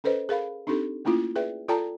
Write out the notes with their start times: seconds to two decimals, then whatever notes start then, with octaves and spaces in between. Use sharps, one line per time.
0.04 C#4 A4 B4 C5 D#5
0.29 G#4 A#4 F5 B5
0.67 C4 D4 D#4 G4 A4
1.05 A3 A#3 C#4 E4 F4
1.36 G#4 B4 D5 E5 G5
1.68 F4 A4 D5 G5 A5 A#5